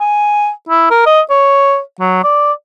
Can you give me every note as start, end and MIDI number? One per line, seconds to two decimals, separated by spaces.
0.01 0.50 80
0.69 0.88 64
0.91 1.03 70
1.06 1.21 75
1.30 1.80 73
2.00 2.21 54
2.24 2.52 74